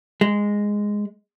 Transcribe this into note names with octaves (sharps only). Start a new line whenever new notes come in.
G#3